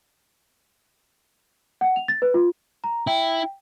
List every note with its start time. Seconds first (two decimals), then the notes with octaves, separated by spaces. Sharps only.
1.81 F#5
1.96 F7
2.08 A6
2.22 B4
2.34 F4
2.84 A#5
3.07 E4 G5